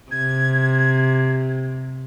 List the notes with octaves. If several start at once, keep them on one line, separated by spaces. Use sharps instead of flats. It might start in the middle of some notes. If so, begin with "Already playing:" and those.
C3 G#6